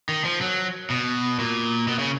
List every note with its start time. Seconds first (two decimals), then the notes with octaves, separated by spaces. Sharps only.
0.09 D#3
0.24 F3
0.41 F#3
0.90 B2
1.39 A#2
1.88 B2
1.99 C#3